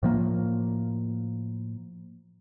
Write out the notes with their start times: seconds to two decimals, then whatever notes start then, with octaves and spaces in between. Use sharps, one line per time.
0.03 A2 F3 A#3